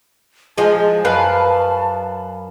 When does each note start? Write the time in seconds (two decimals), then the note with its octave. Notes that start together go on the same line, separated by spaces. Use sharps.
0.58 F3 G#3 A5
1.05 F#2 B4 F5